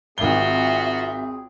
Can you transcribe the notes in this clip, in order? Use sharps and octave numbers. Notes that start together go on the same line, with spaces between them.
G#1 C4 F4 F#4 G#4 E5 G7